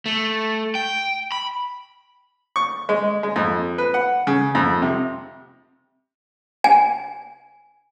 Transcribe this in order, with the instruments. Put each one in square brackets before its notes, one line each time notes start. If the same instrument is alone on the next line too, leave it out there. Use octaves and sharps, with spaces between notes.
[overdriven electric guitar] A3
G5
B5
[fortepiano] C#6
G#3
G#3
F2
B4
F#5
C#3
F2
C3
[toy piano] G#5